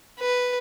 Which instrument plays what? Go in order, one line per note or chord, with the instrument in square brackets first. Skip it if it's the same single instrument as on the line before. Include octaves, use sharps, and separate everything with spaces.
[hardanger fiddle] B4